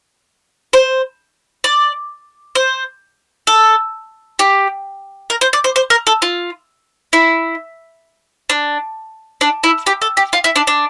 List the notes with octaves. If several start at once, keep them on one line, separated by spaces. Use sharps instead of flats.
C5
D5
C5
A4
G4
A#4
C5
D5
C5
C5
A#4
A4
F4
E4
D4
D4
E4
G4
A4
G4
F4
E4
D4
D4